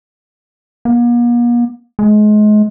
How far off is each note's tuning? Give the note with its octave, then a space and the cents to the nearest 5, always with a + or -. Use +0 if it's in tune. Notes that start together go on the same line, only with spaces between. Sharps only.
A#3 +45
G#3 +30